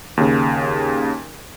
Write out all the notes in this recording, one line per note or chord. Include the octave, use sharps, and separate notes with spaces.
D#2 C#3